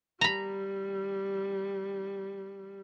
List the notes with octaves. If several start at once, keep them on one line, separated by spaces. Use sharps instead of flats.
G3 A#5 B5